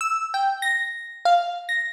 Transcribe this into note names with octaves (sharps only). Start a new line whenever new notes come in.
E6
G5
A#6
F5
A#6